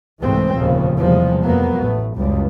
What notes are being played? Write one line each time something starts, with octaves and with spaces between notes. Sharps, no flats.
C2 G#2 E3 G#3 A3 C4
F1 D#2 A#2 C#3 F3
E2 C3 F3 G3 G#3
F2 F#3 A#3 B3
A1 A3
F#1 C#2 G3